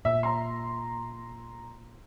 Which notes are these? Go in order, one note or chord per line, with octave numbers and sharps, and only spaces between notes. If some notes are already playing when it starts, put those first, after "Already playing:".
A#2 E5
A#5 C6